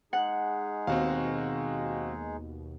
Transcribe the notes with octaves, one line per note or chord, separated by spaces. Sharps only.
G#3 D#4 G#4 F#5
D#2 B2 C4 F#4 F5